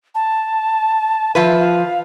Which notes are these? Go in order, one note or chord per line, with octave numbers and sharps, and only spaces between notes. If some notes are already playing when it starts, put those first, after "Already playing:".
A5
F3 F4 B4 E5
F5